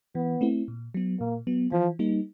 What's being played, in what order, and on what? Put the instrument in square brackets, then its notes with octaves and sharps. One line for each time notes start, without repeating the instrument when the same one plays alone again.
[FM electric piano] E3 [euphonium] B3
[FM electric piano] A3 C4 E4
A#2
F#3 B3
[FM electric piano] A#2 [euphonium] A#3
[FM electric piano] F#3 B3
[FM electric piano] E3 [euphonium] F3
[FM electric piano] G3 A#3 D#4